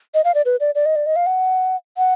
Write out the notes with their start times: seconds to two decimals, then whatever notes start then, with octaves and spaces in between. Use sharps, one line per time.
0.14 D#5
0.25 F5
0.35 D5
0.45 B4
0.60 D5
0.75 D5
0.86 D#5
0.96 D5
1.06 D#5
1.16 F5
1.26 F#5
1.98 F#5